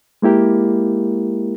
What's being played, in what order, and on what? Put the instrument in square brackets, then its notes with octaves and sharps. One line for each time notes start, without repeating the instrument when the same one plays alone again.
[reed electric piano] G#3 A#3 E4 G4 A#4